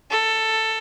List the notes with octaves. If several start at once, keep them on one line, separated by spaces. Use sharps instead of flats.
A4